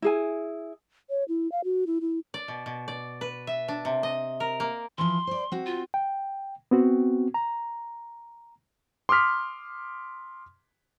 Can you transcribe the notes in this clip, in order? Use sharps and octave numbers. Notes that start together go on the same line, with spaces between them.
E4 G#4 G#5
C#5
E4
F5
F#4
E4
E4
D5
B2
B2
D5
B4
E5
D4
C3
D#5
A#4
A#3
E3 F3 C6
C5 D5
C4 F#4
F4
G5
B3 C4 F#4
A#5
C6 D6 D#6 F6 B6